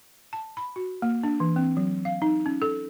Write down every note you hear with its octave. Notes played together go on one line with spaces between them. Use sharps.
A5
B5
F#4
A#3
D4
E3
C4
F#3
F5
D#4
C#4
A4